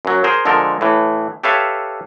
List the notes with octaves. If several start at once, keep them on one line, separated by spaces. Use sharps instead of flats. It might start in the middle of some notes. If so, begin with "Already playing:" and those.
F#2 F#3
G#4 A#4 C5
D3 F3 G#3 A4 A#4
A2 E3
G4 A4 B4 C#5 E5 F5